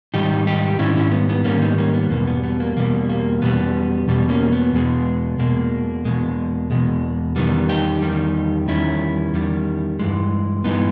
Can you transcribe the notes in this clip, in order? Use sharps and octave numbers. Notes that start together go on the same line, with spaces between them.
G#2 D#3 G3 D#4 G4
D#4 G4
G#2 D#3 G3 C#4 E4
C#4 E4
B3
B3
G#2 D#3 G3 A#3 C#4
B3 D#4
A#3 C#4
B3
E2 B2 G3 A#3
B3
B3
A#3
E2 B2 G3 A#3
A#3
E2 B2 G3 B3
E2 B2 G3
A#3 C#4
B3
E2 B2 G#3
E2 B2 G#3 A#3
E2 B2 G#3
E2 B2 G#3
E2 D#3 G3 B3
D#4 G4
E2 D#3 G3
E2 D#3 G3 C#4 E4
E2 D#3 G3
G2 E3 G#3
G2 E3 G#3 B3 D#4